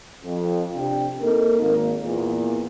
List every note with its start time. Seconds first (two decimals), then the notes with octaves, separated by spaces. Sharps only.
0.24 F2
0.76 C3 D4 G5
1.21 A#3 C4 D#4 A4 A#4
1.61 G#1 A#3 A#4
2.03 E2 A#2